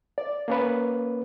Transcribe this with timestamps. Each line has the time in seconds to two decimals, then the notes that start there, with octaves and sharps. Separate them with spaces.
0.18 D5
0.48 A#3 C#4 B4